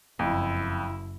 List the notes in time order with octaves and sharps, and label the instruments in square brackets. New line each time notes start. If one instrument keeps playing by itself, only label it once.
[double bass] F#1 E4 [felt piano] F2